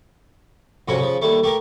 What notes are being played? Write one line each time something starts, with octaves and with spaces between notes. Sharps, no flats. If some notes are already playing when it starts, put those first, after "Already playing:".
F2 G#2 C3 C#4 F#4
C#3 F3
D#2 G3 A3
A3 G4 A#4